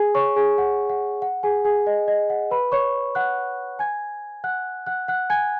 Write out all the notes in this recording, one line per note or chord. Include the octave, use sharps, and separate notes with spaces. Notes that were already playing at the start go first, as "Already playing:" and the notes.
Already playing: G#4 G#5
C#5 C#6
G#4 G#5
F#5
F#5
F#5
G#4 G#5
G#4 G#5
D#5
D#5
F#5
B4 B5
C#5 C#6
F#5 F#6
G#5 G#6
F#5 F#6
F#5 F#6
F#5 F#6
G#5 G#6